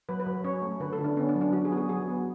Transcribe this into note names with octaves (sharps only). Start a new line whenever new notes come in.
F#3 B4
B4
F#3
C#4 C#5
A3
D3 B4
A4
D3
D4
B3 C#4
D4
F#3
D4
F#3 F#4
G#4
B3 F#4
G#4
F#3 G#4
B3